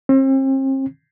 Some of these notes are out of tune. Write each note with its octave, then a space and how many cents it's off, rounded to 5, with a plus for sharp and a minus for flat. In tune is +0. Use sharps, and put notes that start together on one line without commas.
C4 +40